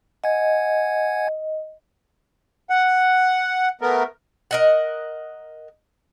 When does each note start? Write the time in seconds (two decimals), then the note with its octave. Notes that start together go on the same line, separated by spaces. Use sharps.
0.24 D#5 F#5 G#5 G#6
2.70 F#5
3.81 A3 B3 A#4
4.51 A#4 D#5 F#5